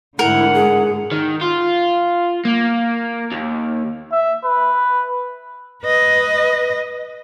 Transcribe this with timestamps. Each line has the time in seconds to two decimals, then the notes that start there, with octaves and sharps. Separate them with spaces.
0.19 G#2 D3 A3 E4 A#4 F#5
0.54 G#4
1.12 D#3
1.41 F4
2.45 A#3
3.31 D#2
4.12 E5
4.45 B4
5.83 B4 D#5